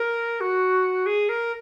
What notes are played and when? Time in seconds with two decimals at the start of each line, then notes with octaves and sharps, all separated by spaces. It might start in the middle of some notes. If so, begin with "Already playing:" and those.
Already playing: A#4
0.41 F#4
1.06 G#4
1.29 A#4